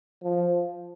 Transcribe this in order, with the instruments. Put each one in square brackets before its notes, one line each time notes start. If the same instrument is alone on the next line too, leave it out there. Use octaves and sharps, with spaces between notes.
[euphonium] F3